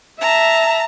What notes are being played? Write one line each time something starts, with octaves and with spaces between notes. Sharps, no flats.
E5 A5 A#5